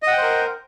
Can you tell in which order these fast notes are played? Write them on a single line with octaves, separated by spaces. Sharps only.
D#5 F#5 G5 C5 A#4